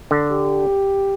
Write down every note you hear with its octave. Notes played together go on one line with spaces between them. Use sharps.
D3
G4